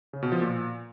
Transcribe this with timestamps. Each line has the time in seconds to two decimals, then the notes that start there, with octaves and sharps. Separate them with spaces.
0.13 C#3
0.23 B2
0.32 F3
0.41 A#2